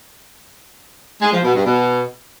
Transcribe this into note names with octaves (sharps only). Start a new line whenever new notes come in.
G#3
F3
B2
G2
B2